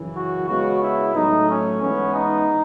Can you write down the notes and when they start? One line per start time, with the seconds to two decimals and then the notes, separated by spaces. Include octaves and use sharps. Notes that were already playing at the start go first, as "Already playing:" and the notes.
Already playing: F#2 C#3 E3
0.14 F#4
0.47 C#3 G#3 B3 F#4
0.81 E4
1.14 A2 F#3 A3 D#4
1.47 C#4
1.80 G#2 E3 G#3 B3 C#4
2.14 D#4